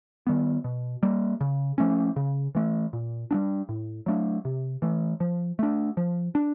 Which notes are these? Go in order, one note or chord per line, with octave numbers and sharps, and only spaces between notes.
D#3 G3 B3
B2
G3 A#3
C#3
F3 A3 C#4
C#3
E3 A3
A#2
G3 B3 D4
A2
F#3 A3 D4
C3
E3 A3
F3
A3 D4
F3
D4